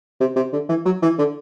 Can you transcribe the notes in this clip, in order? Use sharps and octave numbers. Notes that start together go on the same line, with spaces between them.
C3
C3
D3
E3
F#3
E3
D3